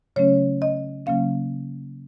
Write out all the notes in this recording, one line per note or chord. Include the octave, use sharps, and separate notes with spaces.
C#3 F#3 A3 C#4 C#5
D#5
C#3 F#3 A#3 C#4 F5